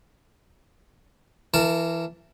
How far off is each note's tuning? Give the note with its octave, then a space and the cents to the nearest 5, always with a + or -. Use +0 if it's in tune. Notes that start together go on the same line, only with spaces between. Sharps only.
E3 +15 A#4 -25 A5 +0